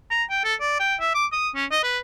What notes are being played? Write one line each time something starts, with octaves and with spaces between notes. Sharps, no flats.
A#5
G5
A4
D5
G5
E5
D6
D#6
C#4
D#5
B4